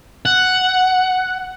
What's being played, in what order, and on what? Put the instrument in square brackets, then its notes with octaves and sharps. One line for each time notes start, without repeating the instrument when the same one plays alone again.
[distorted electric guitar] F#5